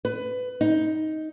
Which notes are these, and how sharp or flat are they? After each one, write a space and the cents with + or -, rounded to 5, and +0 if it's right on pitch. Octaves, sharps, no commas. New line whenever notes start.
B4 +20
D#4 +10